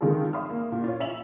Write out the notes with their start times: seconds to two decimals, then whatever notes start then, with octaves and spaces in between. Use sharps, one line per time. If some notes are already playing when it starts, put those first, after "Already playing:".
0.01 C3 D#3 G#3 F4 G#4 A4
0.33 E5 C6 D#6 F6
0.50 A#3
0.72 A#2
0.84 F4 C#5
1.00 E5 F7 F#7